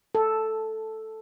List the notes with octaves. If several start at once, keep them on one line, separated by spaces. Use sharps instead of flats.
A4